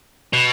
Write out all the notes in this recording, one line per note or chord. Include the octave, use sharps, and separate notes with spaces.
B2